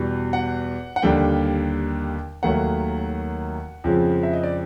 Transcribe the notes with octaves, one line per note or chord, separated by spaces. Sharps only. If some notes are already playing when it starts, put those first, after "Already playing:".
Already playing: E2 B2 G3
F#5
F#5
D#2 D3 G3 A#3 G5
D#2 D#3 F#3 A3 F#5
F2 C#3 F3 G#3 C4
E5
D#5
D5